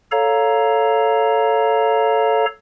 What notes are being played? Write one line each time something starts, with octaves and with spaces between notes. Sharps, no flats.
A4 C#5 F5 A#5